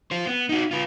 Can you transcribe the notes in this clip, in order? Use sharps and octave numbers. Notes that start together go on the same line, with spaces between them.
F4 C5
B3
D#4 F#4
F4 B4